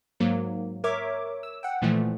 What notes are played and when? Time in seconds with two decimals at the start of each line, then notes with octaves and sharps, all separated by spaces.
0.20 G#2 F#3 A#3
0.84 A#4 C#5 E5 D6
1.43 E6
1.63 F#5 G5
1.82 A#2 E3 F3 A3